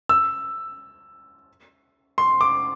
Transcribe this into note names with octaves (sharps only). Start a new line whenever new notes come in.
E6
C6
D6